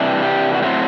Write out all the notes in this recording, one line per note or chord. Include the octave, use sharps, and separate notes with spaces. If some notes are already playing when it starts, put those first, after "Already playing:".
Already playing: C3 E3 G3 D4
G4
F#4
A2 F#3 A3 C4 G4